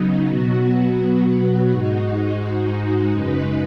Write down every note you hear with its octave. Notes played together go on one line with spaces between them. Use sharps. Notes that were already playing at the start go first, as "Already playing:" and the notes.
Already playing: C#3 F#3 B3 D#4
B2 F#3 B3 F#4
G#2 G#3 D#4 F#4
F#2 C#3 G#3 D#4 B4